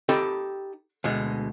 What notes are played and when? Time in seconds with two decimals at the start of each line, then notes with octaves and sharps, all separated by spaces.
0.09 D#4 G4 A4 G5 B5
1.04 D2 B2 G#3